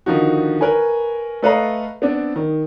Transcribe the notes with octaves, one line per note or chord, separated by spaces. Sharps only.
D3 D#3 F3 D#4 F#4
A#4 B4 C#5 G#5
A3 A4 B4 D#5 F5 A#5
B3 C4 D4
D#3